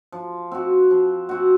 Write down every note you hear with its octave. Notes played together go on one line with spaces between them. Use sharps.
F3
C4 F#4
F3
C4 F#4